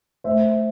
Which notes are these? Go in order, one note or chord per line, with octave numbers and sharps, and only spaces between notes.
A3 C5 E5